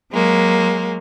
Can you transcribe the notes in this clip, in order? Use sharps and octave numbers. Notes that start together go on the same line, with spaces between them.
F#3 G#3 A#3